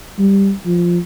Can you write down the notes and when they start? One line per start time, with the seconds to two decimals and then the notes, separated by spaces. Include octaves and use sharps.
0.19 G3
0.66 F3